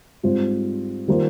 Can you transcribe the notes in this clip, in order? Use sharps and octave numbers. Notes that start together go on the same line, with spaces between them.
G#2 G3 C4 F4 C5
D#3 G3 A#3 F4 C5